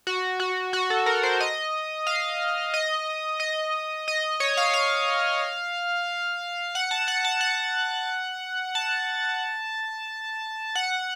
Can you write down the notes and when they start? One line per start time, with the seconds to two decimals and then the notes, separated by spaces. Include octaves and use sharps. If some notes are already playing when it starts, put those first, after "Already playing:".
0.07 F#4
0.40 F#4
0.73 F#4
0.90 A4
1.06 A#4
1.23 C5
1.40 D#5
2.07 F5
2.74 D#5
3.40 D#5
4.08 D#5
4.40 C#5
4.57 F5
4.74 F5
6.75 F#5
6.91 A5
7.08 F#5
7.25 A5
7.41 F#5
8.75 A5
10.75 F#5